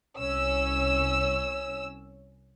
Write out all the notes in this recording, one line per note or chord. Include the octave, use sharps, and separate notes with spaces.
C2 C#4 E6